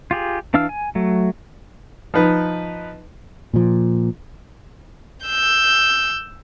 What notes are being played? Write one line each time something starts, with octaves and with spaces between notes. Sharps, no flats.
F4 G4 G#4
E3 D4 F5 E6 F6
G#5
F#3 A3
F3 D#4 B4
A#2 F3
E6 G6